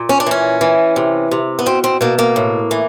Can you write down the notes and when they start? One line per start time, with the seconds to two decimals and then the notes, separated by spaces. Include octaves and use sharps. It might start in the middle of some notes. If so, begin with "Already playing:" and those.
Already playing: A#2
0.09 C#4
0.20 D4
0.26 E3 C#4
0.61 E3
0.96 C3
1.31 C3
1.59 B3
1.66 B2 C4
1.84 C4
2.01 B2 A#3
2.18 A#3
2.36 A2
2.71 E3